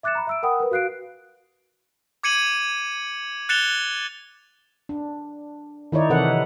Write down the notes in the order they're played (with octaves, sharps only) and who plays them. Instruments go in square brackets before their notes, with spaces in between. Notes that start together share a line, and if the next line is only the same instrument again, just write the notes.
[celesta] E5 D6 F#6 A6 C#7 E7
A#5 B5
E5 E6 D7
A#4 F#5 G5 B5 D#6
A#4 B4
F#4 F5 F#6 C7 D7
[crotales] D6 G#6 C#7 D#7 F#7
F#6 A6 C#7 E7 F7 G7
[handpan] D4
D#3 D#4 E4 C#5 D5
C3 E3 A4 B4 F#5